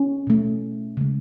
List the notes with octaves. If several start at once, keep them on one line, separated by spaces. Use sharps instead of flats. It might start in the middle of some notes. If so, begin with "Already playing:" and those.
Already playing: C#4
B2 A3
C#3 G#3